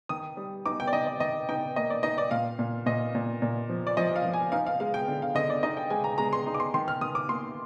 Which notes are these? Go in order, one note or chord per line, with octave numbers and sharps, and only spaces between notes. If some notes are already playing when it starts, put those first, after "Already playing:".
D#3 D#6
G3
D#4 D6
G5
D5
D#4 D#5
D#5
D#3 D#5
D#4 G5
A#3 D#5
D5
D#4 D#5
D5
A#2 F5
A#2
A#2 D#5
A#2
A#2
F3
D5
F3 D#5
F5
F3
G#5
D#4 F5
F5
G#3 F5
G5
D3
F5
D3 D#5
D5
D#4 D#5
G5
G#3 G#5
A#5
G#3 A#5
C6
D#4
D6
C6
D#3 C6
F6
D#3 D#6
D6
A#3 C6